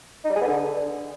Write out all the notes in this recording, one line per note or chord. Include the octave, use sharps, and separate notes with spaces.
D#4
G3
G#4
B3
D3